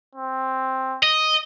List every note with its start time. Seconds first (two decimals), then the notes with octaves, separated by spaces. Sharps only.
0.15 C4
1.03 D#5